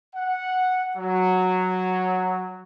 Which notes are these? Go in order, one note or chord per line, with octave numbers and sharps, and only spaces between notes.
F#5
F#3